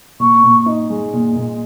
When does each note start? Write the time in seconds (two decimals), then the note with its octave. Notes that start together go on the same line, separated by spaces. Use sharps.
0.20 A#2 C#6
0.43 A#2
0.66 D#4
0.90 G#3
1.13 A#2
1.35 A#2